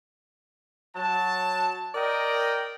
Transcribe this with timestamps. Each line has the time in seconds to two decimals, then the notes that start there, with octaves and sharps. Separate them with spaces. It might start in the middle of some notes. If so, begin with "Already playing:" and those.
0.96 F#3 A5
1.95 A#4 D5 D#5 G5